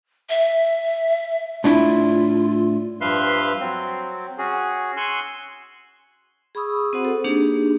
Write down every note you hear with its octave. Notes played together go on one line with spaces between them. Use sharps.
E5
A2 D4 E4 F4
G2 F3 B4 E5 F5 C6
F#3 C4
C#4 F#4 G#4
G#5 C6 C#6 E6 F#6
G#4 B5 C#6 D#6 E6
C4 F#4 C5 F#5
A4
A#3 D4 D#4 G4 G#4